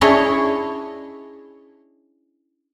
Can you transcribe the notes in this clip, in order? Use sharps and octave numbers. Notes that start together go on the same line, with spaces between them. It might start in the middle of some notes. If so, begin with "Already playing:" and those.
C#4 D4 E4 G#4 C#5 D#5